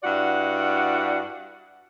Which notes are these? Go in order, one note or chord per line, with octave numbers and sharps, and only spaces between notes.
G2 E4 F#4 D5 F#5